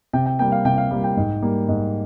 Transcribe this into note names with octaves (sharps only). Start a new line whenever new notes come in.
C3 G5
G5
G3 A#3 G5
F5
C3 G5
F5
G3 A#3
G5
G#2
G3 A#3
G#2